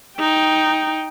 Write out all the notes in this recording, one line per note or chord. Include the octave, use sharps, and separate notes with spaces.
D#4 G5